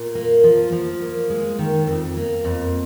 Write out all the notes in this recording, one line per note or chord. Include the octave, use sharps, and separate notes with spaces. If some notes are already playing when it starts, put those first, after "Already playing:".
Already playing: A#2
A#3
F3
F3
A#3
G#3
D#3
F2
A#3
F2